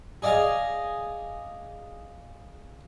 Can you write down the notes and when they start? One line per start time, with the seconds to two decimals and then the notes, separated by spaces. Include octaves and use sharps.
0.22 G#4 D5 D#5 F5 G#5